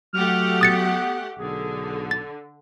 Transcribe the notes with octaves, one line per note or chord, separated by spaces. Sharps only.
F#3 A3 G4 F#5 F6
B3 D#6 A6 C#7
B1 D3 G#4
A6